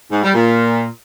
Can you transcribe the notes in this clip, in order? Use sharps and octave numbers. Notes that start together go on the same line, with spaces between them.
G#2
G3
A#2